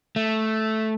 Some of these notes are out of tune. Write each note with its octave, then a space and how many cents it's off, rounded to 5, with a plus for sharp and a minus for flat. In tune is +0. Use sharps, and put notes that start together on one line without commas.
A3 -5